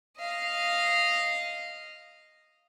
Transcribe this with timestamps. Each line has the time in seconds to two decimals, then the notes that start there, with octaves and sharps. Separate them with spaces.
0.18 D#5 F5